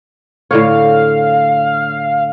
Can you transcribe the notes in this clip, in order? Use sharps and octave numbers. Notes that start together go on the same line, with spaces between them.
A2 D3 C#5 F5